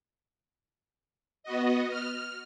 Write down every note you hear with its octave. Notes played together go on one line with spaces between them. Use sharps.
B3 F#4 D#5
F6